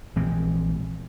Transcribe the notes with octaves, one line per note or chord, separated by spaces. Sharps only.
A#1 E3 G#3 C4